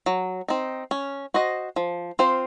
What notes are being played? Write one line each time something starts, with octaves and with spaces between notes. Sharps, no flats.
F#3
C4 D#4
C#4
F#4 C5 D#5
F3
C4 F4 C5